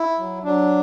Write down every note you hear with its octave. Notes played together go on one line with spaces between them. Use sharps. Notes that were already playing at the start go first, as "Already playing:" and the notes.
Already playing: E4
F#3
F#3 D4